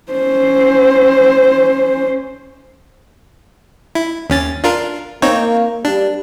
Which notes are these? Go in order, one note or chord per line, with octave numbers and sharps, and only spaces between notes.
C#4 C5
E4
D#2 C#4 A6
D4 F4 A#4
A#3 C4 D#4 C#5
G3 D4